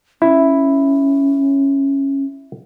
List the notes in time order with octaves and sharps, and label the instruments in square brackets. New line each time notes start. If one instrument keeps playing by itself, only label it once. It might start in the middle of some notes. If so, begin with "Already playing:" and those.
[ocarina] C#4 [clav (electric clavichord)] E4